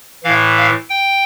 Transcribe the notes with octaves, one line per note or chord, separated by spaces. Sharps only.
A2 E3 F5
F5
G5